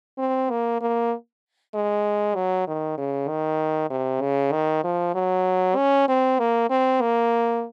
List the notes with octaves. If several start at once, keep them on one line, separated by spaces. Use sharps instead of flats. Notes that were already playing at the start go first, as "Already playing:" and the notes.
C4
A#3
A#3
G#3
F#3
D#3
C#3
D#3
C3
C#3
D#3
F3
F#3
C#4
C4
A#3
C4
A#3